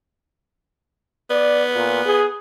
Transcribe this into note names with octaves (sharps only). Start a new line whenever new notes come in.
B3 D5
A#2
G#4